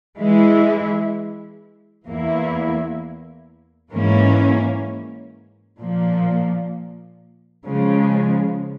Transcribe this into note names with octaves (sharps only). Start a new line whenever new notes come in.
E3 G#3 E4
E2 E3 A#3 E4
G#2 E3 A#3 C#4
A#2 F3 A#3
C#3 F3 G#3